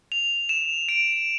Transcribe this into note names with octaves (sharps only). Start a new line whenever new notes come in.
F7
E7
D7